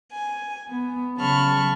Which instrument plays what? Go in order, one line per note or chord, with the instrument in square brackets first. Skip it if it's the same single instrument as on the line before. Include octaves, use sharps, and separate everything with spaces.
[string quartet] G#5
B3
C#3 F#3 A5 B5 C#6 F6